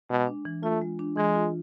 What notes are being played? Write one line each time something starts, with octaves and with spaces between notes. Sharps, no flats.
B2 G#3
D4
E3
A3 F4
G#3
D4
E3 G#3
F4